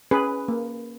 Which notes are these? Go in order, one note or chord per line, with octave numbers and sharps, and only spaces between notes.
C#4 G#4 B4
A#3